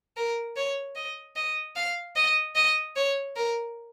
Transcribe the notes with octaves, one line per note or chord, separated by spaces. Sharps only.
A#4
C#5
D#5
D#5
F5
D#5
D#5
C#5
A#4